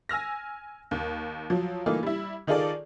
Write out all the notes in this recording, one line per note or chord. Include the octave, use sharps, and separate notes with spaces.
G#5 E6 F6 A#6
D#2
F3 F#3
E3 A3 A#3 D#4 F4
G3 E4
D#3 D#4 F4 G#4 A4 D5